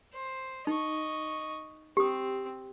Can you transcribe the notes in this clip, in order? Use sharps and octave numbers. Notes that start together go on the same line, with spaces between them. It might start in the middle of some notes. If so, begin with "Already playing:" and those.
C5
D#4 D#5 C#6
C4 G4 D#6